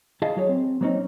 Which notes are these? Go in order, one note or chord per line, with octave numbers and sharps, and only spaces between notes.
E4 G#4 D#5 F5 A5
F#3 G#4 C#5
C4
F#3 A#3 C4 C#4 D#4